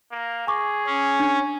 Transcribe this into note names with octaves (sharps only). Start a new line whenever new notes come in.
A#3
G#4 G#5 C#6 D6
C#4
D4 G#6